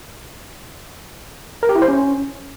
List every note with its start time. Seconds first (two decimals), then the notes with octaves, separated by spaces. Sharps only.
1.63 A#4
1.69 G4
1.75 E4
1.82 C5
1.88 C#4